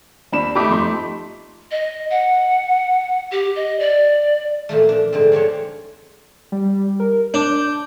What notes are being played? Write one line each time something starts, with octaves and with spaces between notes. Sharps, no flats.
D#2 D4 B5 E7
A3 D#4 G4 B5 D6
F2 C6
D#5
F#5
G4
D#5
D5
A#2 E3 F3 A3
F3 D4
G#2 D3 A3 C4
F3 C4 D4 C#5
G3
A#4
D4 G6